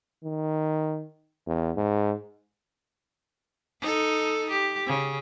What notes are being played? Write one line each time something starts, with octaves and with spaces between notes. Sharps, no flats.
D#3
E2
G#2
D#4 A4
G4
C#3